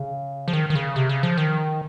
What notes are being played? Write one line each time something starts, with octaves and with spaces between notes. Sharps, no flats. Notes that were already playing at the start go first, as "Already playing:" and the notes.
Already playing: C#3
F3
D#3
D#3
C#3
C3
C#3
F3
D#3